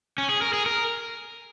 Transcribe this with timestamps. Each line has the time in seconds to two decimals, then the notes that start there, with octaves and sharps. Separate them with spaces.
0.18 C#4
0.29 G#4
0.42 A#4
0.53 G#4
0.66 A#4